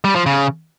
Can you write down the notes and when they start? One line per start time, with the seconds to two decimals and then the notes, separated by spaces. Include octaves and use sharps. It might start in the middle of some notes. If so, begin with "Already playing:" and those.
0.04 G3
0.15 F3
0.26 C#3